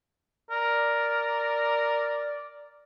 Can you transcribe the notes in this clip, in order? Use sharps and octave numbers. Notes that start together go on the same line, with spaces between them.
A#4 D5